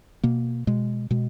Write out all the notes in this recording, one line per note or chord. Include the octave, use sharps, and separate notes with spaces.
B2 A#3
B2 G#3
B2 G#3